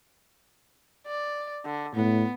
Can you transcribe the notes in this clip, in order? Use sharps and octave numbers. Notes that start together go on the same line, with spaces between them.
D5
D3
A2 B3